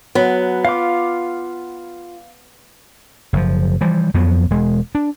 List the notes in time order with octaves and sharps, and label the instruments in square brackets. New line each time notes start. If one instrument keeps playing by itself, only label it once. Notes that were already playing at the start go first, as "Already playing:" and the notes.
[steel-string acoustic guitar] F#3 [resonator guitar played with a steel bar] B3
[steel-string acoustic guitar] F4 [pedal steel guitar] F5 D6
[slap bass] F#1 F3
E3 F3 G3
F2 F3 F#3 B3
E1 G#3
D4